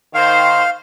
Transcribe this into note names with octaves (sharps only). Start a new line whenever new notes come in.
D#3 C5 F5